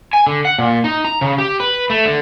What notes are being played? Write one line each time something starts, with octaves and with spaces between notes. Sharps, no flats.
G#5
D3
F#5
A#2
D#4
A#5
C#3
G4
B4
A3
D3